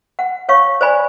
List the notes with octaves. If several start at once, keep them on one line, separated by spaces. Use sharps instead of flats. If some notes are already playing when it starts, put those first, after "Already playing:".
F#5
C#5 F5 C#6
C5 D5 G#5 B5